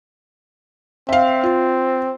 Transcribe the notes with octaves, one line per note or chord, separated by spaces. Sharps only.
C4 E5 F5
F4